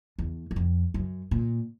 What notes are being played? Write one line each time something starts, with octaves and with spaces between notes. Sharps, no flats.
E2
E2
F2
F#2
A#2